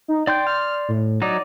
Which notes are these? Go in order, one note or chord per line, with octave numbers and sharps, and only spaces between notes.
D#4
D5 G5 C6 G6
F6
A2
F#3 D#4 D5